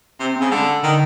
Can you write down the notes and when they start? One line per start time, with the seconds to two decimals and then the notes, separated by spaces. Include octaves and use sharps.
0.19 C3 C4
0.36 C4
0.41 C#3
0.51 D3 G#3
0.83 D3 D#3